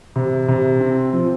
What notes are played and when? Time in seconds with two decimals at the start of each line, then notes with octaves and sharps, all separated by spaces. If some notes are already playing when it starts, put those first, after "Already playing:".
0.16 C3
0.48 C3
0.81 C4
1.13 F3